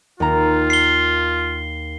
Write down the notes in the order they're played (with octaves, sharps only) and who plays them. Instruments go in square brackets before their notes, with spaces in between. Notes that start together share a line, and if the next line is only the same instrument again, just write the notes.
[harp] D#2 A#5 [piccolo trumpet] F4
[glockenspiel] C7 G7